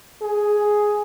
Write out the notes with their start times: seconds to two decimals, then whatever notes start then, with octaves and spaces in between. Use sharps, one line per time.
0.22 G#4